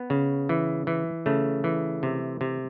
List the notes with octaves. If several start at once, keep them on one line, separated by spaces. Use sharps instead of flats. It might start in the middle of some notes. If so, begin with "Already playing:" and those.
Already playing: B3
C#3
E3
E3
C#3 A3
E3
C3
C3